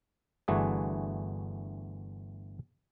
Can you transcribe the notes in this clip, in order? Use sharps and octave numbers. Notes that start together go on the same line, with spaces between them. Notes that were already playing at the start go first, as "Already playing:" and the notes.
G1 E3 A3 D4 F#4 G#4